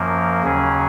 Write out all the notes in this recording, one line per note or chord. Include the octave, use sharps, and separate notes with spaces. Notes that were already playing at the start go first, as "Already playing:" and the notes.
Already playing: F#2 F3 A#3
D#2 C#3 F#3 C#4 G#4